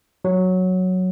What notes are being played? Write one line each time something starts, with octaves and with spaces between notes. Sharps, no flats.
F#3